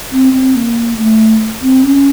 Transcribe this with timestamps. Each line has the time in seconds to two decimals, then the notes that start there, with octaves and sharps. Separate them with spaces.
0.12 C4
0.33 C4
0.55 A#3
0.98 A3
1.62 C4
1.83 C#4